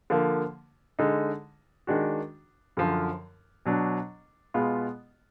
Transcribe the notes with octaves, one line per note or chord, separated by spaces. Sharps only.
D3 F3 A#3
D3 G#3 D#4
D#3 G#3 D4 F#4
F#2 D3 F3
B2 F#3 D4
B2 G#3 B3 F4